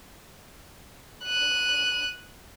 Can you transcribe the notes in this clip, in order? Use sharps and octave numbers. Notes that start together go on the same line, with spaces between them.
F#6 D#7